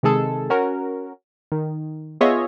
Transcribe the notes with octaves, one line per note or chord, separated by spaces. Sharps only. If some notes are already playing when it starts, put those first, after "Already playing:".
C3 D#3 G#3 G#4 A4
C#4 F#4 A#4
D#3
B3 F4 G#4 C#5 D#5 E5